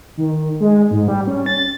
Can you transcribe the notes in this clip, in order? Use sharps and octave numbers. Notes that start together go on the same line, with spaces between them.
D#3
G#3
G#2
G3
C#4
A6